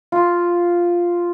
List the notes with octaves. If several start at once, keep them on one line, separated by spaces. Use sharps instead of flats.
F4